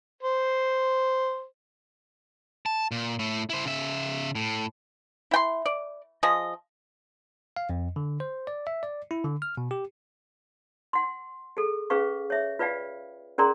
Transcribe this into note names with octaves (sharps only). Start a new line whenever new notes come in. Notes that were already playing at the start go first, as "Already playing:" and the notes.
C5
A5
A#2
A2 A3
E4 C5
C#3 E5
A2
E4 G5 C6
D5
F3 G#4 D#5
F5
F2
D3
C5
D5
E5
D5
E4
D3
F6
B2
G4
F#5 C6
G#4 A4
C#4 G#4 B4 F5 C#6
C#5 E5
F4 B4 D5 F5 G5
C#4 G#4 A#4 D5 A#5 C6